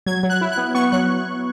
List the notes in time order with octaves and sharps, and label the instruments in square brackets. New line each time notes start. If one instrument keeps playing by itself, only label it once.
[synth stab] F#3 G#6
F#3
F#6
E4
F#6
B3
B3 C#6
F#3 F#6